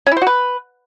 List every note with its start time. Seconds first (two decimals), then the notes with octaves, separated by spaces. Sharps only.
0.07 C#4
0.12 E4
0.17 C5
0.22 F#4
0.27 B4